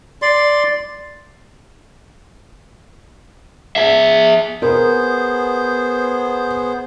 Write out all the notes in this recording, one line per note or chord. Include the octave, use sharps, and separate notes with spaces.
D5 C6
G#4 E5
B3 G#4 A#4 C5